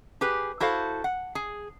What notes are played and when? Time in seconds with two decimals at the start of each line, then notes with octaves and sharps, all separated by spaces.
0.21 G4 G#4 B4
0.60 E4 F#4 A4 C5 F5
1.04 F#5
1.35 G#4